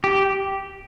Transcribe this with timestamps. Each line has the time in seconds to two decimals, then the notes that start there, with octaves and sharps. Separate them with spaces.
0.04 G4